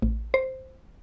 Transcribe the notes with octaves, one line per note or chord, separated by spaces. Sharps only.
A1
C5